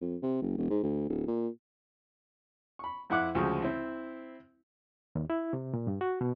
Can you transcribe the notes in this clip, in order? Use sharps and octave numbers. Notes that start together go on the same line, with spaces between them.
F2
C3
F#1
E1
G#2
D2
D1
A#2
B5 C#6
F2 E4 F#5 D6 F#6
D2 C#3 F3 G#3 F#4
C4 E4
D#2
E4
C3
A#2
G2
F#4
B2